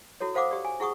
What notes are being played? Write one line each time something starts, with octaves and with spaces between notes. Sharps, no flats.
E4 F#4 A4 C#5
A4 C5 F5 F#5 D6 D#6
G4 D5
G#5
E4 G#4 F#5 C#6 D#6